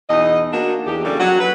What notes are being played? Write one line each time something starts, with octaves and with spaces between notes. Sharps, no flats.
E2 B2 D#4 D#5
A#3 D4 D#4 F#4
E2 G4
C#3 F#3 G3 A#3 D4 A4
F#3 F#5
B4